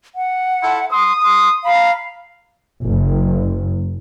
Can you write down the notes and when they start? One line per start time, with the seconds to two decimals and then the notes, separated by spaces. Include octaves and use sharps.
0.15 F#5
0.62 E4 F4 A4
0.91 C6 D#6
1.23 C6
1.64 F5 A#5 B5
2.84 F#1